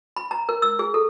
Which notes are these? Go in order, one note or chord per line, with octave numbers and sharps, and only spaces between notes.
B5
A#5
A#4
E6
G#4
A4